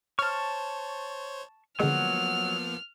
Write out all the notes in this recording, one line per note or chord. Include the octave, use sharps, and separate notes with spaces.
C5 C#5 A5 C#6 F6
D3 F3 F#3 G#3 A#3 B3 F#5 F6